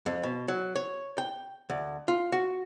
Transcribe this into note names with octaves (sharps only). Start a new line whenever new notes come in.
F2
B2
F#3
C#5
G5
D2
F4
F#4